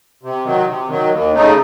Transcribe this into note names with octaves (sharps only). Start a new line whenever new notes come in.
C3
D#3 F#3
C3
D#3 F#3
D#2
C#3 A3 D#4